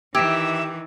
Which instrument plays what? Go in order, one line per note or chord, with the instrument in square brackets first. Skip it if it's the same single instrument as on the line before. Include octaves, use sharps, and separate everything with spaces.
[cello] D#3 E3 [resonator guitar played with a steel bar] G4 [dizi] E5 [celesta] E6 G#6 D7